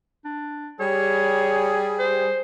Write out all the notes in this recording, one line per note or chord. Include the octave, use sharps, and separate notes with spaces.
D4
G3 G#4 C#5
C5